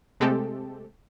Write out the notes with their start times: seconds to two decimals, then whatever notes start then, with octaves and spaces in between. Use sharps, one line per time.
0.20 C3 G#3 A3 C4 G4 A4